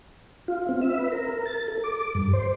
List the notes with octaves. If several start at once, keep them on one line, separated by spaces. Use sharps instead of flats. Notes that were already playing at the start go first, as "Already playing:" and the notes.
F4
C4
E5
B4
A#4
A#4
A6
A4
D6
G2
C5